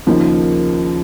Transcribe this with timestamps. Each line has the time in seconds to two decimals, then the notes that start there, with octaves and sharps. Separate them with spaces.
0.06 D#2 C#3 F3 A#3 D#4